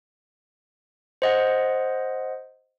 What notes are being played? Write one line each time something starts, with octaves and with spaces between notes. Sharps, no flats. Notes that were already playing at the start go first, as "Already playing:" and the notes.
C5 D#5 F#5